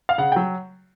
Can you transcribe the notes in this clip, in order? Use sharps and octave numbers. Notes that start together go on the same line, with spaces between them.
F5
C#3 F#5
G5
F#3